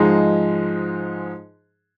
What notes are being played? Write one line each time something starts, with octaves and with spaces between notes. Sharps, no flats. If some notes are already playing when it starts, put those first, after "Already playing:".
Already playing: G#2 F3 G#3 D#4 G#4